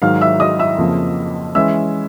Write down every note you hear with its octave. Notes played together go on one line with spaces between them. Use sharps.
G#2 D#3 F#3 F5 F6
E5 E6
D#5 D#6
E5 E6
F2 C#3 F3 A#3
E3 G#3 C#4 E5 E6